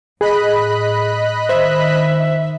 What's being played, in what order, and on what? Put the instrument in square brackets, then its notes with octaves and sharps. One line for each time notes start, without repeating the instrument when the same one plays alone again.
[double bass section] A2 [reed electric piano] G#4 [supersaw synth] D#5 B5 F#6
[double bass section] D#3 [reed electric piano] C5 [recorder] E5